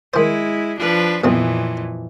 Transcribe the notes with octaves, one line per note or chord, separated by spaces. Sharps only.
D#3 G#3 E4 C5
F3 D4 B4
B1 F2 A#2 E3 C4 D#4